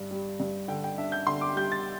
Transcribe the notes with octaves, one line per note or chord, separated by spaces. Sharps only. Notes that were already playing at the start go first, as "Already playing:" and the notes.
Already playing: G2
G3
G2
D3 G5
G5
D4 E5
G6
D3 C6
D6
G3 G6
A6